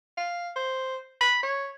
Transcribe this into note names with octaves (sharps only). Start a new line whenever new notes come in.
F5
C5
B5
C#5